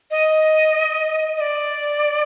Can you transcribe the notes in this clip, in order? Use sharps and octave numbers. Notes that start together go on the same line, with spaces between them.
D#5
D#5
D5